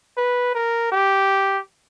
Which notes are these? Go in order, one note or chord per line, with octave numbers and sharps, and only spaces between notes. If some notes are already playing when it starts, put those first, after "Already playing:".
B4
A#4
G4